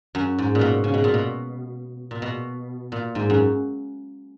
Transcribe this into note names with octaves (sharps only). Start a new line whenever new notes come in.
F#2
G#2
A#2
B2
C#3
B2
A#2
B2
A#2
B2
A#2
G#2
F#2